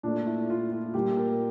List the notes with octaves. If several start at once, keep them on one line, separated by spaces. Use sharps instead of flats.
A#2 A3 D4
E4
F4
F4
A#2 G3 A#3 G4
A#4